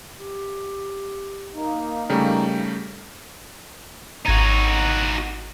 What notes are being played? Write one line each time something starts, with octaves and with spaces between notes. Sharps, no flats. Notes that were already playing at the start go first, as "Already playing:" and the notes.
G4
A#3 D#4
C#3 G3 A3 G4 A#4 G5
G#1 D#4 F#4 G#6 D#7